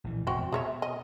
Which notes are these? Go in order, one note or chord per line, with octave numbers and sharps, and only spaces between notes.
A#1 E3
E1 B2 C4 F#4
B2 G#4 C#5 E5
D#5